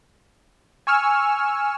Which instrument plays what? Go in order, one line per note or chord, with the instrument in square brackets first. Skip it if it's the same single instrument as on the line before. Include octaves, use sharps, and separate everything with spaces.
[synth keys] G#5 C#6 E6 F6